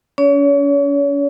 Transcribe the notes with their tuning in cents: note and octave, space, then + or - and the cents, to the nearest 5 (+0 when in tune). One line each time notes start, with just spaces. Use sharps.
C#4 +35 C#5 +35